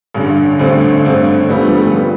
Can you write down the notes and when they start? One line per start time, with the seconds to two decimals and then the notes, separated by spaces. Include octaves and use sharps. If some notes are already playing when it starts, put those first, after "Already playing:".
0.14 A1 G2 D3
0.59 A1 G2 D3 A3 C4
1.05 A1 G2 D3 A3 C4
1.50 A1 G2 D3 G3 B3
1.61 F3 A3
1.73 G3
1.84 F3 A3
1.96 G3
1.99 F3